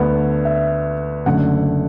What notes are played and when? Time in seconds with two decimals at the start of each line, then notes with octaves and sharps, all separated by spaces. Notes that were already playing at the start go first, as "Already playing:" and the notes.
Already playing: D2 D3 B3
0.45 E5
1.26 F#1 F#2 D3 A3 F#5